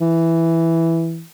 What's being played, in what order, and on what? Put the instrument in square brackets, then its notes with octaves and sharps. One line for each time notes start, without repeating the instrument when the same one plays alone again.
[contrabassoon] E3